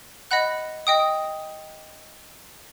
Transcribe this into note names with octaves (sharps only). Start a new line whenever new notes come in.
D#5 F#5 B5 F#6
D#5 G5 D#6